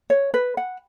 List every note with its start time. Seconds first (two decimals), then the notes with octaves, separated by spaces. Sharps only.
0.10 C#5
0.34 B4
0.57 F#5